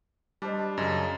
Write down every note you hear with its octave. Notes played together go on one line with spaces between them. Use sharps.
G3 D4 C5 D#5
F#2 C#3 E5 A5